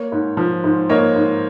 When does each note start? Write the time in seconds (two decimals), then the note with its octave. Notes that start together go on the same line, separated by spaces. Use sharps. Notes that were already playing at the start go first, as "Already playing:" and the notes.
Already playing: A#3 C#5
0.12 G#2
0.37 F3
0.64 G#2
0.89 A#3 C#5 D#5
1.16 G#2